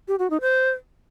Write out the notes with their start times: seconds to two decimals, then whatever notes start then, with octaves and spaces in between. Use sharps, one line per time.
0.08 G4
0.19 F#4
0.30 D#4
0.41 C5